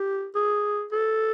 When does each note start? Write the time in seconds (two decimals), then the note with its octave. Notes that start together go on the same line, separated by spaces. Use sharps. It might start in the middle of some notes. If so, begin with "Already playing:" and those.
Already playing: G4
0.36 G#4
0.92 A4